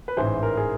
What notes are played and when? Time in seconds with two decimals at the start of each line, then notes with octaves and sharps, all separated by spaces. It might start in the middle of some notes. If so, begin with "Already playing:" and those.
0.08 B4
0.17 A1 G#2 E3 C5
0.43 A#4
0.57 G#4